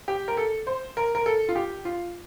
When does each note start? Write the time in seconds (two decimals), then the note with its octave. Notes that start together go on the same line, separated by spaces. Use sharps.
0.08 G4
0.28 A#4
0.37 A4
0.67 C5
0.97 A#4
1.15 A#4
1.26 A4
1.49 F4
1.56 G4
1.85 F4